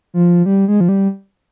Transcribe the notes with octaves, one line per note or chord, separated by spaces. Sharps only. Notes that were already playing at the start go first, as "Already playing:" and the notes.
F3
G3
G#3
F3
G3